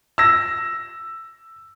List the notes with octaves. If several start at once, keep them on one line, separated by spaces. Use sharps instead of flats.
E6 A#6